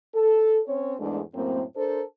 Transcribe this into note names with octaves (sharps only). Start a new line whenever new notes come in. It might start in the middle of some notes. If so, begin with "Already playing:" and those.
A4
C4 C#4 C#5
E2 G#2 G#3 A3 D4
F#2 A2 A#3 C4
D4 A4 A#4 C5